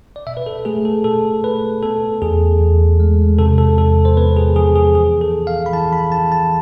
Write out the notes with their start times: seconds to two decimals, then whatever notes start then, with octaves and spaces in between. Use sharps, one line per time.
0.16 D5
0.27 B2 E5
0.37 B4
0.46 A4
0.65 A3 G#4
0.85 A4
1.04 B2 A4
1.44 A3 B4
1.83 B3 A4
2.22 E2 G#4
2.61 E2
3.00 G#3
3.38 C3 A4
3.58 A4
3.78 E2 A4
4.05 C5
4.17 B3 B4
4.37 G#4
4.56 F3 G#4
4.76 G#4
4.95 E3 G#4
5.21 A4
5.34 E3
5.47 F5
5.66 B5
5.73 E3 A5
5.93 B5
6.12 E3 A5
6.32 A5